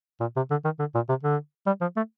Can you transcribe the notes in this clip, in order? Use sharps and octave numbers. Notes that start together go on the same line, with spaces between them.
A#2
C3
D3
D#3
D3
A#2
C3
D3
G3
F3
A3